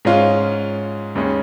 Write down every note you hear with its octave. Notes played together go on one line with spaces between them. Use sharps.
G#2 G#3 C#4 F4
D#2 C#3 G#3 C#4